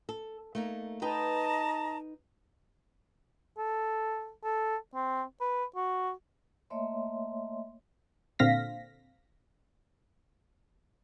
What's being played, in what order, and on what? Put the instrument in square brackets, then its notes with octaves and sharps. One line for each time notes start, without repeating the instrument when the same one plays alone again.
[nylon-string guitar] A4
A3 A#3 D#4
[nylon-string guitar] D#4 B4 G5 [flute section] D#5 A5 A#5
[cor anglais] A4
A4
C4
B4
F#4
[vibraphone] A3 A#3 C#5 D#5 E5 C6
[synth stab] A#2 D3 C4 F5 A#6 B6